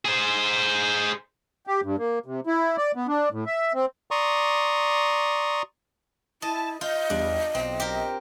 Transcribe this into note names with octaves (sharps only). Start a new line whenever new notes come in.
G#4 C5
G4
G2
A#3
C3
E4
D5
B3
D4
A2
E5
C4
D5 A#5 C6 C#6 D#6
E4 D#5 A5
F4 D#5 G6
E2 G3 D4
B1 C4
G4 A#4